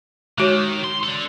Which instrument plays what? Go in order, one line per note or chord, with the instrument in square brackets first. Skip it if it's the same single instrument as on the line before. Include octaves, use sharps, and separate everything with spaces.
[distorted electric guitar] D#3 [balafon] G#3 F#4 C#5
[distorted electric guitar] C6
A4 D5